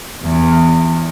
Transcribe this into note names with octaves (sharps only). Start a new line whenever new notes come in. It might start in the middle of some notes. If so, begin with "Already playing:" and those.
E2